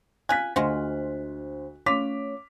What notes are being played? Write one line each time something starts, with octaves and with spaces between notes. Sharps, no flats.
F4 G#5 F#6 B6
D2 G#3 F4 F#4 C5
A3 C#4 F4 C#5 D6 B6 F7